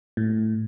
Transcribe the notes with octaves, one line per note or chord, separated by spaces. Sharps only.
A2